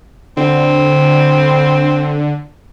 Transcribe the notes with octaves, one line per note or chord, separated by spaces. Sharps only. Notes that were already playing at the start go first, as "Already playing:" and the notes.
D3 C4